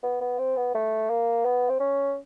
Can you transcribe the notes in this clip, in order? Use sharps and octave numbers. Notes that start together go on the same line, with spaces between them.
B3
B3
C4
B3
A3
A#3
B3
C4
C#4